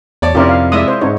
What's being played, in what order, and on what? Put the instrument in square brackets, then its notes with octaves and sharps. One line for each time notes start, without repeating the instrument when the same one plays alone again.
[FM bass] E2 [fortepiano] C#5 D5 A5
[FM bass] F2 [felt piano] C3 [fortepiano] C#4 E4 G4 [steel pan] F4 A#4 D5
[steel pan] F5
[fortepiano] G#3 E4 [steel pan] D5 E5 D#6
[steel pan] C5
[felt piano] G#2 D#4 [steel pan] C#5